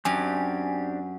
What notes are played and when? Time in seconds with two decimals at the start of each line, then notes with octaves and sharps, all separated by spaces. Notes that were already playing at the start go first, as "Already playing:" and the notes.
0.05 F#2 C4 D4 G4 G#5